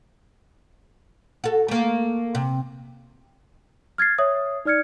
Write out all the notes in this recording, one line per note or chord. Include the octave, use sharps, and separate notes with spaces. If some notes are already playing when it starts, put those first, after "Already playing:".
F#4 A4
A3 A#3
C3
F6 G#6 A6 C7
C#5 E5 D#6
D#4 D5 F6 G#6 C#7